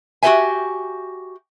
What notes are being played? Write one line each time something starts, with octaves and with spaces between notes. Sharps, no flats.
F#4 G4 A4 C#5 E5 G#5